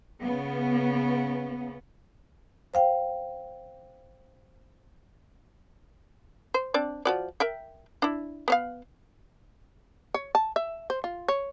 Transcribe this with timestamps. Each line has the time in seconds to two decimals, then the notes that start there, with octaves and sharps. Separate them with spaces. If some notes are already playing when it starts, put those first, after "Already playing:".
0.22 C#3 B3
2.74 C5 F5 G5
6.54 C5
6.74 C4 D4 D5
7.05 F3 F#4 D5
7.40 A#4 E5 G5
8.02 D4 E4
8.48 B3 C#5 F5
10.14 C#5
10.35 A5
10.56 E5
10.90 C5
11.04 F4
11.28 C#5